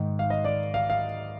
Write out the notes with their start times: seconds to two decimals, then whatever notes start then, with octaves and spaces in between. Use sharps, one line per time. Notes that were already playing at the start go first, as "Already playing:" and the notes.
Already playing: G#2 D#3
0.19 F5
0.30 D#5
0.44 D5
0.74 F5
0.90 F5